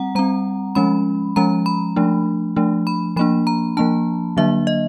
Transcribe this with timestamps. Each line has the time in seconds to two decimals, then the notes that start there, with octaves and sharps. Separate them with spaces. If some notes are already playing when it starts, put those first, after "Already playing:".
Already playing: G3 C4 F#5 A#5
0.15 G3 C4 A#5
0.75 F3 G#3 C#4 B5
1.36 F3 G#3 C#4 A#5
1.66 B5
1.96 F3 A3 D4
2.56 F3 A3 D4
2.87 B5
3.16 F3 A#3 D4 B5
3.47 A#5
3.77 F3 A#3 D4 A5
4.37 D3 F#3 A#3 D4 E5
4.67 D#5